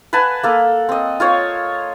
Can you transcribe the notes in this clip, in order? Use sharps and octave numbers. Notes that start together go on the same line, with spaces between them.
B4 F#5 G#5 A5
A#3 A4
C4 D#5
F4 C5 C#5